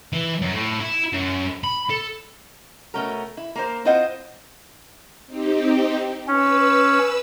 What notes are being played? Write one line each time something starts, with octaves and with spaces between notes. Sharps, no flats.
E3
F#2
A2
E4
F#2
B5
A4
B2 A3 C#4 F#4 A#4
E4
A#3 A#4 C5
C4 E4 F4 C5 D#5 F#5
C4 D#4 G4
C#4 B4 E6